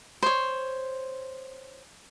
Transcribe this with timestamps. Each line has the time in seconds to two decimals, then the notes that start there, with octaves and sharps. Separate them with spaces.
0.23 C5 C#5